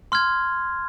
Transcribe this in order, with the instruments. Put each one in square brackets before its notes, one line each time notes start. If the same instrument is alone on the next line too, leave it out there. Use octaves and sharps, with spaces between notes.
[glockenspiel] C6 F6 G#6